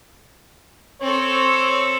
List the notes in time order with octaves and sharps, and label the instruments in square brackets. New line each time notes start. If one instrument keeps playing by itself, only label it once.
[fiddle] C4 A4 [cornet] C#5